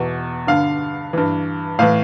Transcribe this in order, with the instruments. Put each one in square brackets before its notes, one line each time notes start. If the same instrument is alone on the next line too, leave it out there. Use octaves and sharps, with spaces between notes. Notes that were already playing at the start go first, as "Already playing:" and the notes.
Already playing: [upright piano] E2 B2
G2 D3 F5
G2 E3
A2 E3 F5